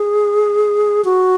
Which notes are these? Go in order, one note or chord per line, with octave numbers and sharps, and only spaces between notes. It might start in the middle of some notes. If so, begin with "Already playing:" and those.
Already playing: G#4
F#4